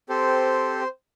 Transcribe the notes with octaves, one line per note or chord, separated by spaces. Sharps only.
C4 G4 A4 C5